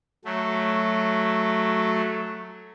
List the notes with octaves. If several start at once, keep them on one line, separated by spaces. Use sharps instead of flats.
F#3 A3